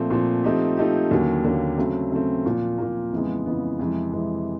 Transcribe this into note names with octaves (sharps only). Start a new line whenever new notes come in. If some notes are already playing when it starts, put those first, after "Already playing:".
Already playing: A#2 F3 A3 C4
A#2 F3 A3 C4
F3 A3 C4 D#4 G4
F3 A3 C4 D#4 G4
D#2 D3 F#3 A#3 C#4
D#2 D3 F#3 A#3 C#4
C#3 F#3 A3 C4
C#3 F#3 A3 C4
A#2 F3 A#3
A#2 F3 A#3
F2 C#3 E3 G#3 B3
F2 C#3 E3 G#3 B3
F2 C3 E3 G#3
F2 C3 E3 G#3